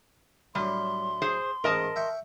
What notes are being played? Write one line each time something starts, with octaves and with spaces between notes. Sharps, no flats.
A2 F#3 G3 D4 C6
G#4 C5
A1 G#2 A#4 D#5 A5
E5 G5 C#6